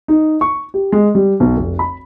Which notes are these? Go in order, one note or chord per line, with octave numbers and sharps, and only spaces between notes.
D#4
C#6
G4
G#3
G3
B1
F1
B5